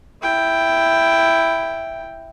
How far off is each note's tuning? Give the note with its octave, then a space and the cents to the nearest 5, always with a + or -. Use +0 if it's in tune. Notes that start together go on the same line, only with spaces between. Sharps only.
E4 +0 G5 +0